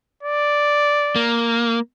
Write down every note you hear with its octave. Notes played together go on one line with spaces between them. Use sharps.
D5
A#3